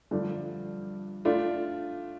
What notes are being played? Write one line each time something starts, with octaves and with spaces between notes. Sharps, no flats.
G2 D3 F3 A3 D4
A3 D4 F4